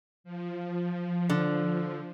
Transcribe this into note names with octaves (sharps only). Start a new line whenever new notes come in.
F3
D3